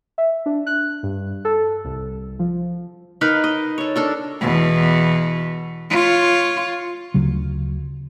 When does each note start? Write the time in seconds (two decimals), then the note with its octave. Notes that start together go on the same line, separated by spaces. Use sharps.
0.18 E5
0.46 D4
0.67 F#6
1.03 G2
1.45 A4
1.84 C2
2.39 F3
3.21 D#4 A#4 B4 F5
3.44 D#5
3.78 A4 C#5
3.96 D4 A4 A#4
4.41 E2 B2
5.90 F4 C#5
7.14 D2 C#3 F#3